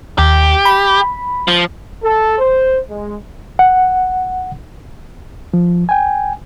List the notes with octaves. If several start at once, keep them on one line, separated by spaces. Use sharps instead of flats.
D#2 G4
B5
F3
A4
C5
G#3
F#5
F3
G5 G#5